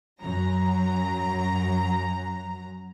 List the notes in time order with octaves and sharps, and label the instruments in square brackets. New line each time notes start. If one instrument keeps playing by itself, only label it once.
[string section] F#2 F#3 A#5